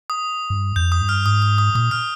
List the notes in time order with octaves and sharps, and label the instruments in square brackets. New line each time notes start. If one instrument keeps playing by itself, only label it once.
[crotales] D#6
[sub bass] G2
[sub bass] F2 [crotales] G6
[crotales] D#6
[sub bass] G2
[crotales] F6
[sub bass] G#2 [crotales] D#6
[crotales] D#6
D#6
[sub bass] A#2 [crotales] D#6
[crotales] F6